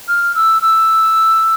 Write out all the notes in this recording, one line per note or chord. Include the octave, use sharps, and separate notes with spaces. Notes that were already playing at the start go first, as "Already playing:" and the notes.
F6
E6
E6